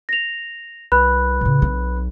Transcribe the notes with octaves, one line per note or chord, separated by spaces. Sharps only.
A#6 F7
C2 B4 B5 F#6
A2 C#3
B1 C4